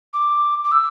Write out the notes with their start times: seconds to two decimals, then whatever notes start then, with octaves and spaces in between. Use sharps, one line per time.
0.13 D6
0.64 D6
0.71 E6